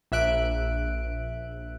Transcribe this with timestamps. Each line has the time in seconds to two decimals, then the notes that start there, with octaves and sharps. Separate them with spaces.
0.12 A#1 E5 F#6 D7